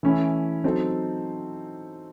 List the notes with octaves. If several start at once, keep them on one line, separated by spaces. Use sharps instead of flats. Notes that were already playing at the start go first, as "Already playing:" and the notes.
E3 A3 C#4 E4
F#3 C4 D#4 A4